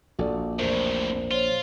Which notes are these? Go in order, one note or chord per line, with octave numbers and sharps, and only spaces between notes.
A#1 F#4 A4 D5
E2 A2 C3 A#4 C5 D5
F4 C5 C#5